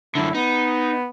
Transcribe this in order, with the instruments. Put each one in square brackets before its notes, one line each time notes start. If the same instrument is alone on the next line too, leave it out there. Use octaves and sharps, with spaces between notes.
[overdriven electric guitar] F#2 D3 [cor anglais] E4
[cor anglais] B3 [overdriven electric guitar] D#4